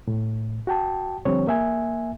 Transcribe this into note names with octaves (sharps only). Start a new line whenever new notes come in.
A2
F#4 G5 A5
D3 F3 G3 C4 G4 C#5
A#3 E5 G#5